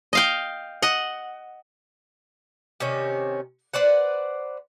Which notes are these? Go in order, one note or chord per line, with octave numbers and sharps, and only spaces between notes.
D#5 F5 G5
D#5 F#5
C3 D#3 C#4
B4 C5 D5 F#5